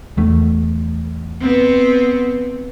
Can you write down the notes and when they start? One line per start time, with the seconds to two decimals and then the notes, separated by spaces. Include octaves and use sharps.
0.17 E2 A3
1.40 B3 C4